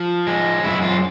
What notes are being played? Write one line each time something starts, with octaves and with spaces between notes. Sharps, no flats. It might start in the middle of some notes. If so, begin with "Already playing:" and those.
Already playing: F3
G#3
F#2 E4
F4